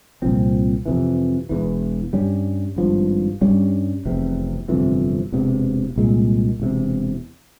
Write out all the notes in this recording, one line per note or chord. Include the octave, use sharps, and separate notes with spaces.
C2 A#2 F3 C4
F2 C3 E3
E1 E2 E3
G2 G3 C#4
G#1 G2 F3
G2 G3 C#4
F1 E2 C3
G1 F2 C3 E3
E1 E2 C3
C2 A#2 G#3
E1 E2 C3